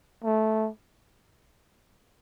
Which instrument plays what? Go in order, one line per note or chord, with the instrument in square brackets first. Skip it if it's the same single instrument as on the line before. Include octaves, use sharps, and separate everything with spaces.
[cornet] A3